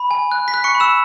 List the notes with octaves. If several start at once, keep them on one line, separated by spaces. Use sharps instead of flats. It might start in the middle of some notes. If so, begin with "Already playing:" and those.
Already playing: B5
G#5
F#6
B6
F#6
C#6 C#7
B5
E6 E7